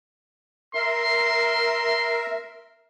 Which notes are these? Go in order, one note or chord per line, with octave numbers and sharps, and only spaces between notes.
A#4 E5 C6